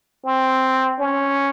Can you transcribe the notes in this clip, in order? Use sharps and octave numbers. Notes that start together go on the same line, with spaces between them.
C4
C#4